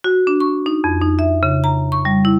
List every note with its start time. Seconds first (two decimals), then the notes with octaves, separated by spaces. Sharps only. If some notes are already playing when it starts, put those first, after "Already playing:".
0.04 F#4
0.27 D4
0.40 C#6
0.66 D#4
0.84 F2
1.01 D#4
1.19 E5
1.43 C#3
1.64 A#5
1.92 C#6
2.05 G3
2.25 E4